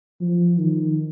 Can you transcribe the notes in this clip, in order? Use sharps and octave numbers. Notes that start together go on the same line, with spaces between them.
F3
D#3